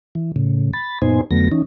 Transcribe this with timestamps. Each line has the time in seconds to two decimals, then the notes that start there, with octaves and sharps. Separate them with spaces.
0.15 E3
0.36 A2 C#3
0.73 B5 A6
1.02 F#2 A#2 B3 D#4 C5 G#5
1.31 F2 D3 F#3 A3 B3 A#6
1.52 E3 C#4 D#4